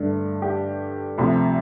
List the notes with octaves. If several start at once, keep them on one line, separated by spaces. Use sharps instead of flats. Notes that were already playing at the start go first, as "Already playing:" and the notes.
Already playing: G2 D3 A3 D4
G4
D2 C3 F3 C4